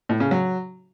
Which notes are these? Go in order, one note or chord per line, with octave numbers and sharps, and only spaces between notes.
A2
C#3
F#3